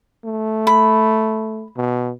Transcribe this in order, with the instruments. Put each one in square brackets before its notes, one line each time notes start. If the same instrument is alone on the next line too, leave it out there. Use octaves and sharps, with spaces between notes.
[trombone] A3
[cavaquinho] B5
[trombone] B2